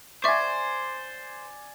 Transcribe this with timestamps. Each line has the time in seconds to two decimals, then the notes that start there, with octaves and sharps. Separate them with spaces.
0.24 C5 D5 E5 G#5 C#6